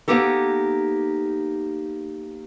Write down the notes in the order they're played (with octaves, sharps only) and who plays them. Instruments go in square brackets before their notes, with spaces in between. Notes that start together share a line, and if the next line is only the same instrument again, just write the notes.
[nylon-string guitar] A#3 B3 D#4 G4 A4